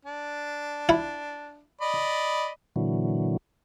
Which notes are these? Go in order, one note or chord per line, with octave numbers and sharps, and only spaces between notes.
D4
E4
D5 D#5 B5
A#2 D3 E3 F#3